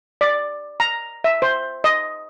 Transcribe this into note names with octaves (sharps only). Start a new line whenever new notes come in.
D5
A#5
E5
C5
D#5